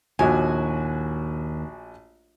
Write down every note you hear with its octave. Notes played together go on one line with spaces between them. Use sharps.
A#1 D#2 F#4 G#5